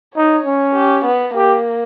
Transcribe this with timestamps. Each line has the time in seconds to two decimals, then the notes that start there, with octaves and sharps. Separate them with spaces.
0.16 D#4 C#5
0.46 C#4
0.75 G4
1.05 B3
1.35 A#3 G4